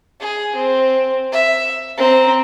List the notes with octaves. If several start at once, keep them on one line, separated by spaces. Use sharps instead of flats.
G#4
C4
E5
C4 A#5